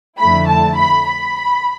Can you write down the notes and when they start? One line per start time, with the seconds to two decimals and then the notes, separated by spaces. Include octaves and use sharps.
0.19 F2 D3 A3 E4 B5
0.48 A5
0.78 B5
1.07 B5